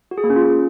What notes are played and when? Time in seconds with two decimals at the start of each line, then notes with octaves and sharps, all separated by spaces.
0.11 F#4
0.18 G#4
0.24 A#3
0.30 C#4
0.36 F4